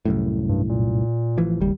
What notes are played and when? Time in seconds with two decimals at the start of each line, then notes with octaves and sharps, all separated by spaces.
0.05 C2 F#2 A2
0.49 G2
0.69 A#2
1.38 A1 E3 F3
1.61 F#1 D#2 G3